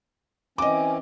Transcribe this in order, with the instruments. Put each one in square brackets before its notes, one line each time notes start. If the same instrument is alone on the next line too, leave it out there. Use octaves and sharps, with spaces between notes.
[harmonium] E3 C4 C#4 [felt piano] D#5 D6 [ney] G#5